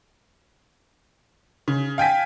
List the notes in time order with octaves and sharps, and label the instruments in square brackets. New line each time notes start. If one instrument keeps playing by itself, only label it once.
[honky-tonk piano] C#3
F5 G5 G#5 B6